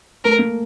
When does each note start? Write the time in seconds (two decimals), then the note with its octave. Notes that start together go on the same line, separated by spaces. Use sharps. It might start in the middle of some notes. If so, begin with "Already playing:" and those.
0.24 A3 A#4
0.39 A#3